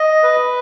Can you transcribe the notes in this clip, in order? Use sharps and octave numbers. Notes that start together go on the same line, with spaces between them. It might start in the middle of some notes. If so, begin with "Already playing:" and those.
Already playing: D#5
B4